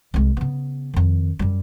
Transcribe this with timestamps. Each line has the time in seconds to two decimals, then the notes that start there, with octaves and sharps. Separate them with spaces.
0.14 C2 G#3
0.37 C#3 B3
0.94 F2 D#3
1.39 F#2 G3